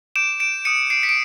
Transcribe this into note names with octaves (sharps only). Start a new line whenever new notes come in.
D6 G6 D7 E7
D7 E7
D#6 F#6 C#7 D#7
C7 D7
B6 C#7
D7